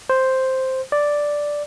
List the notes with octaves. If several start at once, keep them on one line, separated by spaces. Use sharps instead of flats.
C5
D5